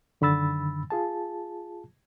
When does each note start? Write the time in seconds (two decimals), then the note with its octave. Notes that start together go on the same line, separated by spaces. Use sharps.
0.21 F#2 D3 D#3 B5 E6 A6
0.90 F4 G#4 A5